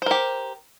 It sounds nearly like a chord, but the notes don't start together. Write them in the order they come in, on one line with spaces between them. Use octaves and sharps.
C5 A#4 G4